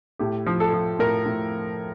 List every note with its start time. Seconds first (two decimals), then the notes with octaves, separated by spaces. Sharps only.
0.19 A2 G4
0.46 F3
0.60 A4
0.73 F3
0.99 A2 A#4
1.26 A2